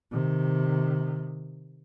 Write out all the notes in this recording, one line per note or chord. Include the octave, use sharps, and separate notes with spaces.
C3 D#3